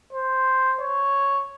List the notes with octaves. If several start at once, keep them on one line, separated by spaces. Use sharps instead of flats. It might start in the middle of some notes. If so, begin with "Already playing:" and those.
C5
C#5